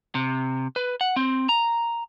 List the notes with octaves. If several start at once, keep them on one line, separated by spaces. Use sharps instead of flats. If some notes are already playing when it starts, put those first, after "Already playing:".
C3
B4
F#5
C4
A#5